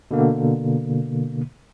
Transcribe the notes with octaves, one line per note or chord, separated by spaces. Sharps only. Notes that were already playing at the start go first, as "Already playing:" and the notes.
B2 D3 A#3